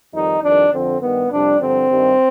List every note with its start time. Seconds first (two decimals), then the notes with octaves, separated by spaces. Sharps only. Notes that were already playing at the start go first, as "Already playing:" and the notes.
0.12 F2 D#3 G3 D#4
0.42 F2 D#3 G3 D4
0.72 F2 D3 F3 C4
1.01 G2 D#3 G3 B3
1.30 F2 C3 G3 D4
1.59 G2 D3 F3 C4
1.89 G2 D#3 G3